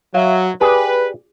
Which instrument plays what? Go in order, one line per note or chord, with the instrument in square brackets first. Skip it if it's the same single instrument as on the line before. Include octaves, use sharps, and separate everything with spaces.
[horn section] F#3 [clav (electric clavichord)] E5 F5
[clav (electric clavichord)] G4 G#4 D5 [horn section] B4